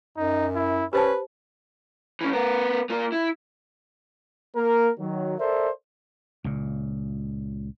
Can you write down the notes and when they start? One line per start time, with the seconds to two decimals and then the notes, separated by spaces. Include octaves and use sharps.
0.17 F#2 D#4
0.55 E4
0.93 C#4 G4 B4 C5 A5
2.21 E3 C#4
2.33 B3 A#4
2.90 A#3 F4
3.12 E4
4.56 A#3 A#4
5.00 D#3 F#3
5.39 A4 A#4 C5 D5 E5
6.44 C#2 A#2